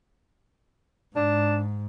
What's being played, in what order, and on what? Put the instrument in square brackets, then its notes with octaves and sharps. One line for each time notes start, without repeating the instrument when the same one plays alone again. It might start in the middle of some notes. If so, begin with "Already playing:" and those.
[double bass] G#2 [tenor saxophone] D4